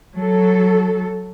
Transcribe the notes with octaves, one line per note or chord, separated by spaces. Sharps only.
F#3 A4